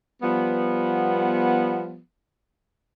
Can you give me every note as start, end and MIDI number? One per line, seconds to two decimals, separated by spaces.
0.22 1.99 53
0.22 1.99 55
0.22 1.99 59